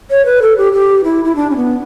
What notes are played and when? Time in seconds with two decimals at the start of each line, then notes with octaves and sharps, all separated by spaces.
0.10 C#5
0.26 B4
0.42 A4
0.58 G4
0.73 G4
1.04 E4
1.25 E4
1.36 D4
1.50 C#4
1.56 B3